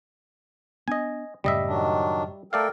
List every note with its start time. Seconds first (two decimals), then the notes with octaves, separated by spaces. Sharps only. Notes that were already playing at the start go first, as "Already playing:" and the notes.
0.88 B3 D4 D#5 G#5
1.44 F#2 A2 C#3 G3 D#5 E5
1.66 D#3 F#3 D4
2.53 A3 A4 A#4 D5 F5 G5